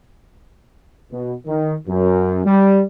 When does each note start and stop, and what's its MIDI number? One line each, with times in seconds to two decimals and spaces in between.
1.12 1.34 47
1.47 1.75 51
1.87 2.41 42
2.45 2.83 55